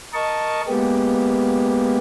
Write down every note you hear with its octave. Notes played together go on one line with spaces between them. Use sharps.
A#4 D#5 A5 C#6
G#3 A#3 B3 G4